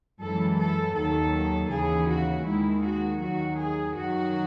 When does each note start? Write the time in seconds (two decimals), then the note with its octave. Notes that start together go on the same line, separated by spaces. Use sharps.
0.20 F#2 E3 G#3 A4
0.58 A4
0.95 D#2 D#3 F#3 A4
1.70 D#2 C#3 E3 G#4
2.08 F#4
2.45 D#2 D#3 G#3 E4
2.82 F#4
3.20 D#2 D#3 F#3 F#4
3.58 G#4
3.95 F#2 D#3 F#3 F#4